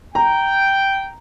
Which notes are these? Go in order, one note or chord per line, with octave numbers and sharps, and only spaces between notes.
G5 A#5